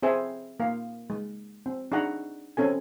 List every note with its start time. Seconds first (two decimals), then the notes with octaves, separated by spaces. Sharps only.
0.02 C4 G#4 C5 E5 G5 G#5
0.60 A#3 F5
1.10 G#3
1.66 C4
1.92 D4 D#4 G#4 F#5 A#5
2.57 C4 C#4 A4 G#5